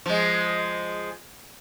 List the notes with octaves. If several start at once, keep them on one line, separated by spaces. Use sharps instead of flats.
F3 G#3